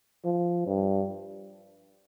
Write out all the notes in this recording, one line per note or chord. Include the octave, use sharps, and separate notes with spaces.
F3
G2